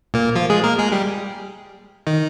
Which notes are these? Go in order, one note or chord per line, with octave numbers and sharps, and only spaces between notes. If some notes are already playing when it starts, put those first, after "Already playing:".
A#2 A#3
F3 F4
G#3 G#4
A#3 A#4
G#3 G#4
G3 G4
D#3 D#4